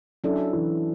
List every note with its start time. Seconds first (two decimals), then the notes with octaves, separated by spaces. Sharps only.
0.24 F#3 C#4 D4 E4 A4
0.53 E3